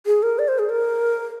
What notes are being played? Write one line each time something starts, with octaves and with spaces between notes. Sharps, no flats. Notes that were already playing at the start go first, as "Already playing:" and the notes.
G#4
A#4
D5
C5
G#4
A#4